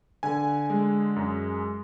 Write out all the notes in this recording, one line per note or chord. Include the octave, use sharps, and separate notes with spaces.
D3 G#5
G#3
F#2